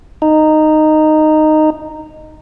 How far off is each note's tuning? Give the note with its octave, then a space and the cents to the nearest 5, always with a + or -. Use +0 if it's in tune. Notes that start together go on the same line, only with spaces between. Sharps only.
D#4 -10